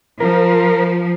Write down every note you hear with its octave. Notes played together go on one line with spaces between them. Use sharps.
F3 A#4